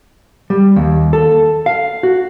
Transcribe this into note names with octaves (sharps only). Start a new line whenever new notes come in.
G3
D#2
A4
F5
F#4